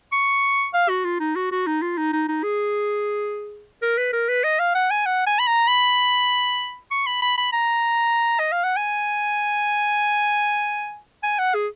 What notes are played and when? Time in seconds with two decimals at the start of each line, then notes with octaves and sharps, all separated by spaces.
0.12 C#6
0.74 F5
0.89 F#4
1.05 F4
1.20 D#4
1.36 F#4
1.52 F#4
1.67 D#4
1.82 F4
1.98 D#4
2.13 D#4
2.28 D#4
2.44 G#4
3.82 A#4
3.98 B4
4.13 A#4
4.29 B4
4.44 D#5
4.60 F5
4.75 F#5
4.91 G#5
5.06 F#5
5.27 G#5
5.39 B5
5.47 A#5
5.68 B5
6.91 C#6
7.07 B5
7.22 B5
7.38 B5
7.53 A#5
8.39 D#5
8.52 F5
8.64 F#5
8.77 G#5
11.23 G#5
11.39 F#5
11.54 G#4